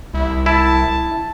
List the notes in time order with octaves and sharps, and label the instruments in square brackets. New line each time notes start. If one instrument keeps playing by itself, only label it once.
[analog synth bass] C2 [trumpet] E4
[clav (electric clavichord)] E4 [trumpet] A5